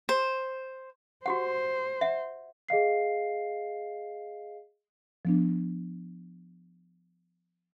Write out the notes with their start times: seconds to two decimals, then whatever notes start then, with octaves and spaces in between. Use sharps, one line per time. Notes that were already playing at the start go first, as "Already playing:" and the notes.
0.09 C5
1.26 F#4 G4 C5 F#5
2.01 E5 F#5
2.69 G#4 D#5 F5 C7
5.25 F3 B3 D4